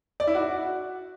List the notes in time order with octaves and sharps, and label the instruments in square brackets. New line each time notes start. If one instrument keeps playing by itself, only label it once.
[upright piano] D5
E4
F#4